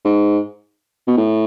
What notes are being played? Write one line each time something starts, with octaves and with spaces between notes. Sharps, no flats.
G#2
B2
A2